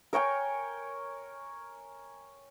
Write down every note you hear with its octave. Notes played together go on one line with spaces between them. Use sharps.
A#4 C#5 G5 G#5